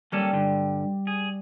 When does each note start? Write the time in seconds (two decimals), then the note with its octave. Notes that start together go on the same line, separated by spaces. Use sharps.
0.12 G3 A#3 C#4 A4
0.33 G2 D3
1.07 G#4